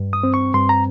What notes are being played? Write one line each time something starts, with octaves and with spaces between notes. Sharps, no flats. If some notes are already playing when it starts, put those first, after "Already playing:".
Already playing: G2
D#6
C4
C#6
G2 C6
A#5